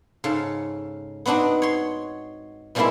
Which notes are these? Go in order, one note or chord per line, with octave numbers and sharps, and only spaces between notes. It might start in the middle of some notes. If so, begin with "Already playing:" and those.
G#2 C#3 A4 F5
B3 C4 D4 D#4 F#4
C#5 C6
B2 G3 G#3 A#3 C4 E4